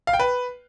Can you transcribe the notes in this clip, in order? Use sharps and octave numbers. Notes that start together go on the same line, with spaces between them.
F5
G5
B4